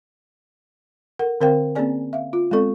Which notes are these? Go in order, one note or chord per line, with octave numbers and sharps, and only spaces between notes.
A4 A#4 F#5
D3 C4 A#4 C5 F5 G5
A#3 C4 C#4 G#4 D5 G#5
E5 F5
F4
G#3 B3 C4 A4 C#6